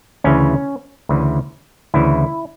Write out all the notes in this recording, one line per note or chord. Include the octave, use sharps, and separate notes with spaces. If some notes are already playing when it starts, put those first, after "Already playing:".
D2 C#3 E3 C#4
D2 C#3 E3
D2 C#3 E3 E4